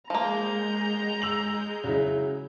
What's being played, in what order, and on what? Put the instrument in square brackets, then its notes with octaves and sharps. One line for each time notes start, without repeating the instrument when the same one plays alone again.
[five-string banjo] F3 A#3 [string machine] G#3 G6 [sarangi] A#5
[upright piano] E6 F7 F#7
C#3 F#3 E4